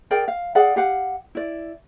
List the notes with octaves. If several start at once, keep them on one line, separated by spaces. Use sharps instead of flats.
G#4 A#4 D5 G5
F5
G#4 D5 F5 F#5
G4 F5 F#5
E4 D5